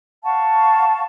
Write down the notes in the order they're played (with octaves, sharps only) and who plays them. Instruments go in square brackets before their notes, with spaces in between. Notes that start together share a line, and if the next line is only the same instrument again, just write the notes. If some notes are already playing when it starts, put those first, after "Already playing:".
[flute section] F5 F#5 A5 C#6